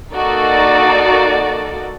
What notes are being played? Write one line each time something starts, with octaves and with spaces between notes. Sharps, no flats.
A#3 D#4 F#4 A4 D5